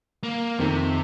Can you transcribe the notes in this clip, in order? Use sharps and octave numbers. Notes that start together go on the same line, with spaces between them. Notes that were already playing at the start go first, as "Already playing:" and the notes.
A#3
F2 C3 D#3